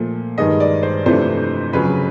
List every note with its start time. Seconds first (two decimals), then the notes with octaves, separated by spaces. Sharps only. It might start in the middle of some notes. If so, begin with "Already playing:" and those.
Already playing: A#2 F3 A3
0.38 G2 D#3 G#3 D#5
0.60 D5
0.83 C5
1.06 F2 C3 E3 A3 D4 C5
1.73 F2 C#3 F#3 B4